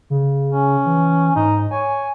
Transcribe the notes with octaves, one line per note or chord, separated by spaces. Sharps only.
C#3
C#4
E3
G#2 D#4
C#5 G#5